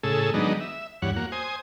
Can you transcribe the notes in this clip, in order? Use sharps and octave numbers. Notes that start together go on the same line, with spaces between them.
A2 C#3 G#4 A4 E6
D#3 F#3 G#3 B3 D4 D#4
E5
E2 G2 C#5 F#5
A#3 F#4
C5 G#5 D#6